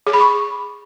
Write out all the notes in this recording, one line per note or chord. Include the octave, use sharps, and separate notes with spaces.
G#4
B5
C#6